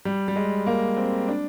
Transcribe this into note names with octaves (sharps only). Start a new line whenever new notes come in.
G3
G3
G#3
A#3
C4
D4